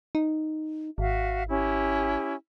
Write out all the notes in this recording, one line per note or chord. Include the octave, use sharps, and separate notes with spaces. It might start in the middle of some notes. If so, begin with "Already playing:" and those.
D#4
G#1 F#4 E5 F5
C#4 E4 G4